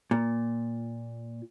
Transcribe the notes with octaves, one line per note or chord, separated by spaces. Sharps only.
A#2